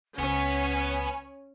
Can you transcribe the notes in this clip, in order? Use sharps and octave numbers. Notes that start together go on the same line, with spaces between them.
C#2 B3 C#4 C#5 G#5